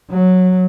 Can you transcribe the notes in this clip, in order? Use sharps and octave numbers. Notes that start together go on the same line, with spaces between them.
F#3